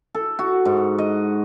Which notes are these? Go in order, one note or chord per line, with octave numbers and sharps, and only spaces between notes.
A4
F#4
G#2
D#5